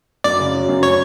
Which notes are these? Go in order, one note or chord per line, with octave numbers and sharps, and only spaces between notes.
F#2 D5
C#3
F#3
F#2
C#5